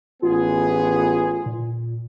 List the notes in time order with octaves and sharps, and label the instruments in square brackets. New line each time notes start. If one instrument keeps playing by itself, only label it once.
[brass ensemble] A1 B3 G#4 [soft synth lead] F4
[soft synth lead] A#2